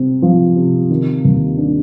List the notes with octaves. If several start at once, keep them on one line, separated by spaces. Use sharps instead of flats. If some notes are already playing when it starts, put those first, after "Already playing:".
Already playing: C3 C4
F3
C3
D#3
D#2
D4